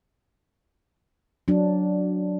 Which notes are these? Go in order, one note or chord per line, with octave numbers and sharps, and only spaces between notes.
F#3 D4